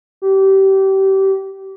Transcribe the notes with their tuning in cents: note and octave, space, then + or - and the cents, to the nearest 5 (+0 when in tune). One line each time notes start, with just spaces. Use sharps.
G4 -25